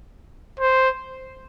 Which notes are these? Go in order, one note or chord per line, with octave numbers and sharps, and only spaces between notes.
C5